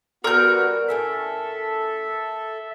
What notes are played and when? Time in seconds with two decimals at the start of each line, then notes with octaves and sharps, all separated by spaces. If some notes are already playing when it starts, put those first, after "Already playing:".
0.24 G3 B3 F#4 A4 A#4 G6
0.88 A2 C#4 A4 E5 G5